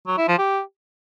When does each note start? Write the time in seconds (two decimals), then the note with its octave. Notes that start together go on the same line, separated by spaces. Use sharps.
0.07 F#3
0.18 E4
0.28 F3
0.39 G4